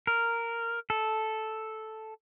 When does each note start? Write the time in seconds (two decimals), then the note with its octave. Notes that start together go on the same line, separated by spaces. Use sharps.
0.07 A#4
0.90 A4